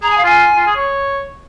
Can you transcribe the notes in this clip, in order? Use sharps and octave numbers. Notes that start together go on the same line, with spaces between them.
G#4 A#5
G#5
F5
F4 G#5
F4
G#4
C#5